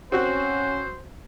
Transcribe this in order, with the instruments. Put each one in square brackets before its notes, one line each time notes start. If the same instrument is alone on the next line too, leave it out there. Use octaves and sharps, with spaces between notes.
[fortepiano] C4 F#4 F#6 [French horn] C#4 [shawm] C5